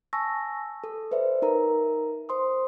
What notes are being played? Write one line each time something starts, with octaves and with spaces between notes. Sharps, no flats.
G#5 A5 C#6 E6 A#6
A4
B4 C5 D5 E5
D#4 A#4 A#5
C5 C6 D#6